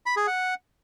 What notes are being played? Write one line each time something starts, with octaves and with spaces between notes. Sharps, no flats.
B5
G#4
F#5